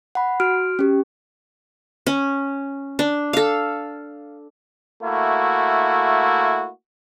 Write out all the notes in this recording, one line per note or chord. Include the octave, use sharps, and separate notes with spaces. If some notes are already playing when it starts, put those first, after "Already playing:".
F#5 B5
F#4 F6 D7
C#4 G4
C#4
D4
A4 F5
A3 A#3 E4 F#4